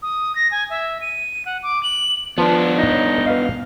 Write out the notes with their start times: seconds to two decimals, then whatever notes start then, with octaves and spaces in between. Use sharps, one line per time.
0.02 D#6
0.36 A#6
0.51 G#5
0.70 E5
1.01 D#7
1.46 F#5
1.63 D6
1.83 F#7
2.38 F3 B3 D4 B4
2.78 D#4
2.92 C#5
3.26 B4 D#5 F5